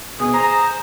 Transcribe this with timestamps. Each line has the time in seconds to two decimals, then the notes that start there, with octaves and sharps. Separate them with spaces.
0.20 B2 G#4
0.34 C5 A#5